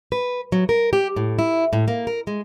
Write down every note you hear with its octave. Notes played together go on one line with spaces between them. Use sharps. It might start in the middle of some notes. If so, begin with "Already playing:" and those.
B4
F#3
A#4
G4
A2
E4
A2
A#3
A#4
G#3